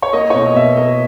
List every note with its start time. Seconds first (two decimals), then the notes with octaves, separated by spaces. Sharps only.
0.02 C#5
0.13 A#3 D#5
0.30 C#5
0.34 B2 D#5
0.47 D#5
0.56 B2 E5
0.77 A#3 D#5